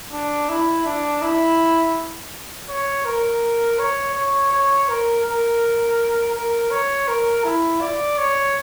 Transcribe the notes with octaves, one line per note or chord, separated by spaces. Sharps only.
D4
E4
D4
E4
C#5
A#4
C#5
C#5
C#5
A#4
A#4
A#4
C#5
A#4
E4
D5
C#5